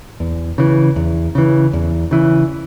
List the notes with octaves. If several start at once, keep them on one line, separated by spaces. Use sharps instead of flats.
E2
C#3 E3
E2
C#3 E3
E2
C#3 E3